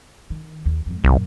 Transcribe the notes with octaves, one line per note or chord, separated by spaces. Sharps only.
D#3
D#2
F2 G#2
C2 F#2 A#2